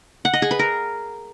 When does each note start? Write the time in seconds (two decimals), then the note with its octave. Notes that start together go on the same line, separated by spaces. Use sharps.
0.25 F#5
0.33 D#5
0.42 G#4
0.51 B4
0.59 A#4